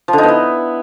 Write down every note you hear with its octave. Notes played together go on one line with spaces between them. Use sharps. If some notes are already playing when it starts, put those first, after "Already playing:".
F3
D3
D#4
B3
E4